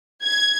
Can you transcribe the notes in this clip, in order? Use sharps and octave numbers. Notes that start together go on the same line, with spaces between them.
G#6